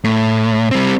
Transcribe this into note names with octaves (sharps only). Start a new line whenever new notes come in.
A2
G3 C4